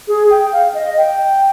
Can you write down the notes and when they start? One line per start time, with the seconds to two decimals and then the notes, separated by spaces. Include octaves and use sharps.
0.08 G#4
0.30 G5
0.53 F5
0.74 D#5
0.97 G5